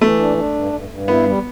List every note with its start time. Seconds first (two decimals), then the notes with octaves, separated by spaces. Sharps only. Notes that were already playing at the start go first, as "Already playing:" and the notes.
0.01 E3 A3
0.20 D4
0.38 D4
0.55 G2
0.73 G2
0.89 G2
1.08 B3 E4
1.26 G3